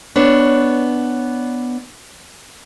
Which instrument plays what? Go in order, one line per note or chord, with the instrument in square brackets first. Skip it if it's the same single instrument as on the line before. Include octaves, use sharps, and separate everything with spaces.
[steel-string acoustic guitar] B3 D4 C#5